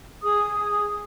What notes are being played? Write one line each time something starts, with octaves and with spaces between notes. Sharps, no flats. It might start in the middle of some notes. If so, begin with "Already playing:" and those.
G#4 D#6